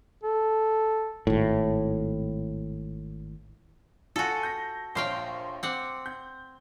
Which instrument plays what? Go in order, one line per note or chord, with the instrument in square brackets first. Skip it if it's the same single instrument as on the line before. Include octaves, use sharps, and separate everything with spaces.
[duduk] A4
[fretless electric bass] G#1 A2
[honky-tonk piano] F4 G#5 [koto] F#4 A4
[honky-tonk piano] G6 A#6
[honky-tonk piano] A#1 C#5 C6 [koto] C5 F5 G5
[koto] C4 F#5 [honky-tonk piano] D6
[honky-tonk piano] G6